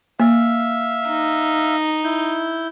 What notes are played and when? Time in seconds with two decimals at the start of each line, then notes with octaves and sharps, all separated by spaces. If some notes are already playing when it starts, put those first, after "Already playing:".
0.20 A#3 E5 F5
1.09 D#4
2.04 E4 G6